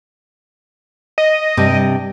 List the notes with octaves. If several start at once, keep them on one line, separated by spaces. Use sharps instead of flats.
D#5
G2 C3 G3